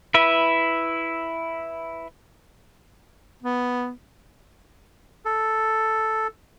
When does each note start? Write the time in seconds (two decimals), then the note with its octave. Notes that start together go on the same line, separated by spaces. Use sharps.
0.14 E4 B4 E5
3.43 B3
5.25 A4